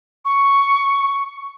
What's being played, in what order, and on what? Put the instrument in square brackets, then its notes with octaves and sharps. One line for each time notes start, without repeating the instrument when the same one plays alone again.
[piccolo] C#6